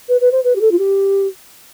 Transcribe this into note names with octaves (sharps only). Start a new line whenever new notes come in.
B4
B4
C5
B4
G4
A4
F4
G4